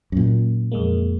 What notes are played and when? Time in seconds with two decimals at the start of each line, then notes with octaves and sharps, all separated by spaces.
0.12 F#2 A#2
0.72 F2 G#3 A#3